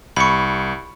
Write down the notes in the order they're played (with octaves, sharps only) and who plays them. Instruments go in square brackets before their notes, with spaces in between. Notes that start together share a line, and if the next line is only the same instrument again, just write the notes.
[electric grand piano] C2 C#7 [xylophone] B5 C#6